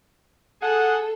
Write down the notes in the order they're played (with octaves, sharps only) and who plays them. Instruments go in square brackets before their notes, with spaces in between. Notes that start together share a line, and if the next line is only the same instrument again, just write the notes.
[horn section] G#4 F#5 [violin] A4